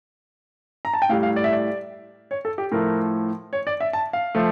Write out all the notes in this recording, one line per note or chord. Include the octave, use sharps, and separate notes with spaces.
A#5
A5
G5
A2 G3 F5
F5
D5
E5
D5
C#5
A4
G4
A2 F3 A3 A#4
C#5
D5
E5
A5
F5
F3 A3